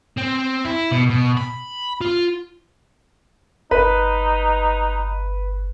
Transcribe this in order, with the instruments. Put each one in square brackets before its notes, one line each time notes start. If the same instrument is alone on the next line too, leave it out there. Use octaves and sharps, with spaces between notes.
[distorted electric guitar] C4
E4
B2
B2
B5
F4
[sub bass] G1 [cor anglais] D#4 [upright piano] B4